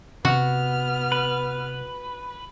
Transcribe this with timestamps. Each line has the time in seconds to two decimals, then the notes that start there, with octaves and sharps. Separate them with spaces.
0.25 C3 B3 F#4 F6
1.12 B4